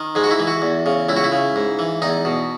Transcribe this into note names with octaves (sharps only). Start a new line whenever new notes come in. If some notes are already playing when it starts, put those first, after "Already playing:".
Already playing: D#3
G#2 G#3
F#4
E4
E3
F#4
E2
C#3
C#2 E4
F#4
E4
C#3
G#2
E3
E2 D#4
B2